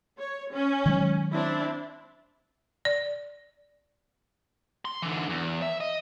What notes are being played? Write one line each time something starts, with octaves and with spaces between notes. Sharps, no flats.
C#5
C#4
D#3 F#3 G#3
C4 D4 E4
D5
C6
D3 E3
E2
E5
D#5